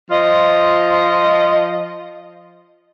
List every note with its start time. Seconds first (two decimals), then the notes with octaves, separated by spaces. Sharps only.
0.11 F3 F4 D#5